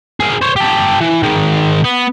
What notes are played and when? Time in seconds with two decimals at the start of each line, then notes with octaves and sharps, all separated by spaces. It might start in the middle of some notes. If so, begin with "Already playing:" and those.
0.20 G#4 A#4
0.42 C5 C#5
0.56 G4 A4
1.00 E3
1.23 D#3 G#3
1.84 B3